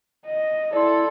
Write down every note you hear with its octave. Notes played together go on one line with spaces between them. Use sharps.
D#5
E4 A4 D5 C6